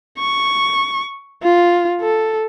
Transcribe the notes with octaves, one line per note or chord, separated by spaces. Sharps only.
C#6
F4
A4